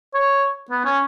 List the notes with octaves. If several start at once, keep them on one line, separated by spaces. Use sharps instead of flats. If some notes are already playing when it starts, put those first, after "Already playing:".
C#5
B3
C#4